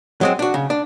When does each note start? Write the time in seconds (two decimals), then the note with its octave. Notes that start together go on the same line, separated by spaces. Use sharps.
0.21 F#3 G#3 C4
0.39 D4 F#4
0.54 C#3
0.70 D4